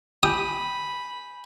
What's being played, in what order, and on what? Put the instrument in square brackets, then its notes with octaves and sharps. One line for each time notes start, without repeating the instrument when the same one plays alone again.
[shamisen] G4 [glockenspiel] G#5 G6 D#7 [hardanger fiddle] B5 [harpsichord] D#6